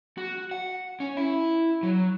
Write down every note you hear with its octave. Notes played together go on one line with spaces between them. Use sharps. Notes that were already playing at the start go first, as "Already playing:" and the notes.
F#4
F#5
C#4
E4
F#3